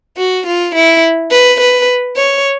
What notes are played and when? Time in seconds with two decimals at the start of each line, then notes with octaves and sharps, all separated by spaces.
0.17 F#4
0.47 F4
0.75 E4
1.31 B4
1.60 B4
2.16 C#5